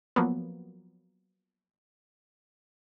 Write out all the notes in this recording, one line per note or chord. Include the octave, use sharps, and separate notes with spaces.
F3 F#3 A#3 B3